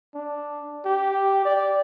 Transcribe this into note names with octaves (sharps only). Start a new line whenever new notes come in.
D4
G4
D5